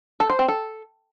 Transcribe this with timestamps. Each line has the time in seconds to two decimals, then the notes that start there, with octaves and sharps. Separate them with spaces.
0.20 A4
0.30 C5
0.39 C4
0.48 A4